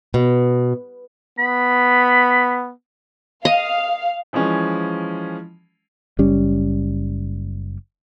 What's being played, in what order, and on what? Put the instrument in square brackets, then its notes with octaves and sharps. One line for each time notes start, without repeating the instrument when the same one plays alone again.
[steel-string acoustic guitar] B2
[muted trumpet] B3 [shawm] B5
[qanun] D#5 [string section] F5
[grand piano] E3 F3 G#3 C#4
[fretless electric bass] F#1 G3 C#4